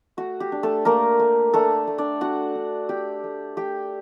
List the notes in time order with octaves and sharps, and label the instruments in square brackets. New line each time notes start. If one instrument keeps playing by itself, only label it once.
[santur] A3 F#4
G4
D4
A3 A4
A3 A#3 A#4
A3
A3 D4 A4
A3
D4 D5
D4 F#4 F#5
D4
A3 G4 G5
A3
A3 G4 G5